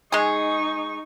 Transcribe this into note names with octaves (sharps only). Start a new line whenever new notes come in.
G#3 D#4 G#4 C#6